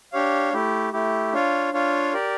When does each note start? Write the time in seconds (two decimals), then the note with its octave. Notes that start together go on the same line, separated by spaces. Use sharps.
0.13 D4 G4 C#5 F5
0.53 A3 E4 G4
0.93 A3 E4 G4
1.33 D4 F4 C#5 F5
1.73 D4 F4 C#5 F5
2.13 G4 A#4 D5